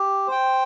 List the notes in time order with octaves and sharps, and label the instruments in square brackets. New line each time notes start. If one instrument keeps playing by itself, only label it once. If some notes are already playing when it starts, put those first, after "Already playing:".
Already playing: [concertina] G4
C5 G5